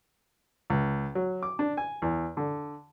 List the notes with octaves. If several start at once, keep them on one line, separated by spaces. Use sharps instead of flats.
C#2
F#3
D6
D4
G#5
E2
D3